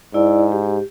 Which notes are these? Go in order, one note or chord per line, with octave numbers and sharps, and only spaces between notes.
G#2 E4 D5
G4